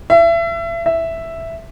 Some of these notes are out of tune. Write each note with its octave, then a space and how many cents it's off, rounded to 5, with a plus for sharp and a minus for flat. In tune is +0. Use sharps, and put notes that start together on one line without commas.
E5 +30
E5 +0